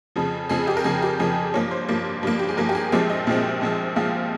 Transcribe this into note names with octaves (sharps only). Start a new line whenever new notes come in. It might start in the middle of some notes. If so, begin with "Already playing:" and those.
F2 C#3 F3
F2 C#3 F3 G#4
G4
A#4
F2 C#3 F3 G#4
G4
F2 C#3 F3 G#4
G2 F3 A#3 C#5
C5
G2 F3 A#3
G2 F3 A#3
G4
G#4
G2 F3 A#3 A#4
G4
G#4
A#1 A#2 F3 G#3 C4 G4
D#5
A#1 A#2 F3 G#3 C4
A#1 A#2 F3 G#3 C4
A#1 A#2 F3 G#3 C4 F5